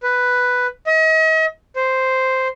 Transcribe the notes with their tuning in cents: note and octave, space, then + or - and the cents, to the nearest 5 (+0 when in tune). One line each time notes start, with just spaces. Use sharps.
B4 +5
D#5 +40
C5 -5